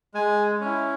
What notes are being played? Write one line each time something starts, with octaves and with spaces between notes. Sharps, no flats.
G#3 G#5
C#4 E4